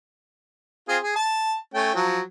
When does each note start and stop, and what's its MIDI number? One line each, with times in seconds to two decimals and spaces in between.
0.89 0.98 60
0.89 0.98 65
0.89 0.98 68
1.03 1.16 68
1.16 1.57 81
1.74 1.95 57
1.74 1.95 61
1.74 1.95 79
1.95 2.21 53
1.95 2.21 54